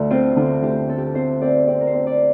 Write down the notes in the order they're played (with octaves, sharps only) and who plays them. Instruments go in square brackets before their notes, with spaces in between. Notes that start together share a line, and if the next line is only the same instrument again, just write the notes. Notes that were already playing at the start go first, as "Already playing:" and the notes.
Already playing: [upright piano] D2 D3 A3 [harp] D4
[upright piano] C4 [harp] F4
[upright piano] D3 [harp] F4
[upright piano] D2 [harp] G4
[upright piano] C4 [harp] A4
[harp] G4
A4
[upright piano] C4 [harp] C5
[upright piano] C4 [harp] D5
[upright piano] C4 [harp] D5
[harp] A#4
C5
[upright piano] C4
[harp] D5